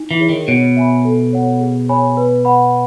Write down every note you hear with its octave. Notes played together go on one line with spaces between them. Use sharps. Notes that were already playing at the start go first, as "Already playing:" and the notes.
Already playing: D#4
E3
G#4 C#5
D#3
B2 C#5
E5 G#5 B5
A4
C#5 F#5
G#4
C#5 G#5 B5
B4
F#5 B5